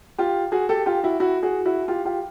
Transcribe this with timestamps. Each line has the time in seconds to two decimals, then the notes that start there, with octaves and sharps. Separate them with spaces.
0.18 F4 G4
0.52 F#4 G#4
0.69 G4 A4
0.86 F4 G4
1.03 E4 F#4
1.20 E4 F#4
1.43 F#4 G#4
1.65 E4 F#4
1.88 F4 G4
2.05 F4 G4